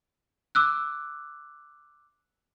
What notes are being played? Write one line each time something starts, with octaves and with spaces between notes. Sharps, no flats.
D6 E6 F#6